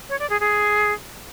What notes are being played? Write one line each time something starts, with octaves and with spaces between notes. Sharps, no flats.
C#5
D5
G#4
G#4